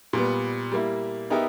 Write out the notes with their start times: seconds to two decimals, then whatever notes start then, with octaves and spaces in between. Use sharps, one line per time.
0.13 A#2 G3 B3
0.72 G3 A#3 E4
1.30 B3 D#4 G4 A#4 E5